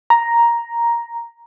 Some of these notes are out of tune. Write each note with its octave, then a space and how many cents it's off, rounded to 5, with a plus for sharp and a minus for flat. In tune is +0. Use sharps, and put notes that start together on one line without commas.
A#5 +5